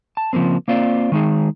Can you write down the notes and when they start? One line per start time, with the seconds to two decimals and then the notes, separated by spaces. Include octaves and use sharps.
0.17 A5
0.33 C#3 F3 G3 A#3 C4
0.68 A#3 C4 F4 D5
1.12 D#3 G#3 D#4 G#4